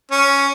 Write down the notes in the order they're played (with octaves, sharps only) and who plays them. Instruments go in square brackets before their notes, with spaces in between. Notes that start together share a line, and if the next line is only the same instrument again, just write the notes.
[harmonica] C#4